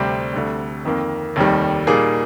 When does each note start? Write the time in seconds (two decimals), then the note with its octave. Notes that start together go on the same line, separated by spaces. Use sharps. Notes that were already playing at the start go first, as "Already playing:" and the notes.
Already playing: D2 C3 G3 C4 G4
0.33 D2 D3 G3
0.85 F2 D#3 A#3
1.36 F1 D#2 D#3 G3
1.87 A#2 G3 A#3 D#4 G#4